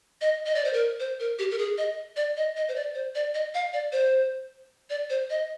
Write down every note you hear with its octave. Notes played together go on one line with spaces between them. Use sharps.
D#5
D#5
D5
C5
A#4
C5
A#4
G4
A#4
G#4
D#5
D5
D#5
D#5
C5
D5
C5
D5
D#5
F5
D5
C5
D5
C5
D#5